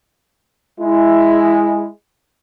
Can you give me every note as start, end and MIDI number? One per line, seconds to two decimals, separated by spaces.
0.80 1.86 56
0.80 1.86 64